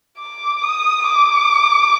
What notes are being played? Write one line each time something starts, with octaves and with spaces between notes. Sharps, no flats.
D6
D#6
D6